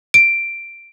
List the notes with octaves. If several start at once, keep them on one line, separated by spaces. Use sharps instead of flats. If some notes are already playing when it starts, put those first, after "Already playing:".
D7